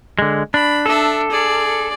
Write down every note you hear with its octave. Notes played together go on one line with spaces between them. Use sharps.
D3 G#3
D4 B5
D4 A4 E5
G#4 D5